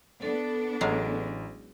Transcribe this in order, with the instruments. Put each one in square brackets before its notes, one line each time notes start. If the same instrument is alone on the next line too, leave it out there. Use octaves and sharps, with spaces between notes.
[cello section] B3 D4 [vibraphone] A4
[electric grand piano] A1 [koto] F#3 G#3 F5